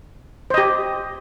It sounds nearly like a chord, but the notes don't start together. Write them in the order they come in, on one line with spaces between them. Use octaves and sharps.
C5 D#5 G4